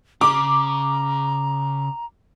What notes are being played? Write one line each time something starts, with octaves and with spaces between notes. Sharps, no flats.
C#3 A#5 D6